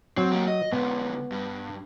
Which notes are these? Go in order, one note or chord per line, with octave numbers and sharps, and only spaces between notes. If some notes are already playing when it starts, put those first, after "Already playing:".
F#3 C4
A#3 G4
D#5
D3 G#3 B3
G2